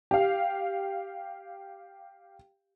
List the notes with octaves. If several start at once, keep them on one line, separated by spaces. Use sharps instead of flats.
G4 F5